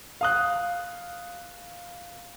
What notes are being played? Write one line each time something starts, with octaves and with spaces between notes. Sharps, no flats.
F5 D#6 F#6